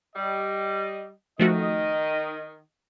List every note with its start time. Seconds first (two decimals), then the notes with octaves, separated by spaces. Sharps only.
0.16 G3 D#5
1.40 D#3 F3 A3 F#4 D#5